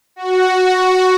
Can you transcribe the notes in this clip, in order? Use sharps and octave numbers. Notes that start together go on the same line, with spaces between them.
F#4